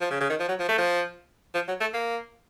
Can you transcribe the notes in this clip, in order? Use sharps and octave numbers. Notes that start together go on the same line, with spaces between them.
F3
C#3
C#3
D#3
F3
F#3
F3
A3
F3
F3
F#3
A3
A#3